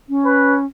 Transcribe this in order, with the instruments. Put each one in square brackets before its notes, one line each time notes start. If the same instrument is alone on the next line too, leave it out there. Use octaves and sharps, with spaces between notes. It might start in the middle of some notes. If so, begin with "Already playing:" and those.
[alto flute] C#4
[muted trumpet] B4